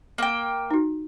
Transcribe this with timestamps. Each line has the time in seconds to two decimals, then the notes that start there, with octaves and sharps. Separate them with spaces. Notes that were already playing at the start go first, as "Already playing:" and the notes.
0.18 A#3 G5
0.71 D#4 F#4